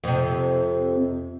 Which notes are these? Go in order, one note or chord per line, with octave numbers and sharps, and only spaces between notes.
F2 C3